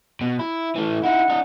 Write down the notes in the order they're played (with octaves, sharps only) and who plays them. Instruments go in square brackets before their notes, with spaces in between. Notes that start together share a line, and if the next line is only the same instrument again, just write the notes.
[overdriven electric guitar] B2
E4
E3 A3
[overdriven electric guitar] D#4 E4 [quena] F#5
[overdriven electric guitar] D4 D#5